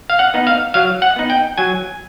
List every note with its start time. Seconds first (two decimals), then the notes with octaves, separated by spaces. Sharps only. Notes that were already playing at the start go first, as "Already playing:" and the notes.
0.10 F5
0.19 F#5
0.34 B3 D#4
0.47 F5
0.74 F#3 F5
1.02 F#5
1.16 B3 D#4
1.30 G5
1.58 F#3 G#5